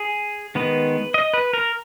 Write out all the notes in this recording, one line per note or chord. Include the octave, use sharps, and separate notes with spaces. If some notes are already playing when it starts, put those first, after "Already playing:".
Already playing: G#4
D#3 G#3 B3 B4
D#5
B4
A#4